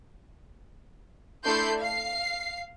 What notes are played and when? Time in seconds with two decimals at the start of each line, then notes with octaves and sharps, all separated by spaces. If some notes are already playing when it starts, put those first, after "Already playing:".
1.45 A3 D4 E4 C6 G6 C7
1.79 F5 C7